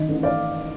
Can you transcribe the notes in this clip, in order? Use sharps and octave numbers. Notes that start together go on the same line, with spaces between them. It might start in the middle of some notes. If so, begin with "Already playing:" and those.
Already playing: D#3 D#5
A1
D5 F5